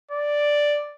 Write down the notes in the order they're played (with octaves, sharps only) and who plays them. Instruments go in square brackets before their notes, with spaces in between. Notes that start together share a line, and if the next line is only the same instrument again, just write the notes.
[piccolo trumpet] D5